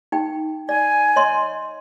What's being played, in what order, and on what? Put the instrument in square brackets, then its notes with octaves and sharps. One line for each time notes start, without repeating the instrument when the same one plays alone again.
[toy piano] D#4 G5
[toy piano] D5 [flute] G#5
[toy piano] C#5 D#5 C6